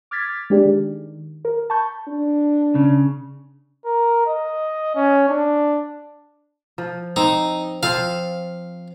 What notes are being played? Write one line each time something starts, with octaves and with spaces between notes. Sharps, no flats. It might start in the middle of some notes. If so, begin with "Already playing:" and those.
D6 F6 G#6 A6 B6
G#3 D4 G4 G#4 D5
D#3
A#4
A5 B5 C#6 G6
D4
C#3
A#4
D#5
C#4
D4
F3
C4 D#4
F3 C4 F4 F5